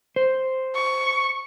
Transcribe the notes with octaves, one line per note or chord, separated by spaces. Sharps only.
C5
C#6